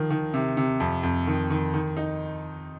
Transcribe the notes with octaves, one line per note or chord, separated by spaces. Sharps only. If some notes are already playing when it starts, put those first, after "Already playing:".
Already playing: D#3 F3
D#3
C3
C3
F2
F2
D#3
D#3
D#3
D#4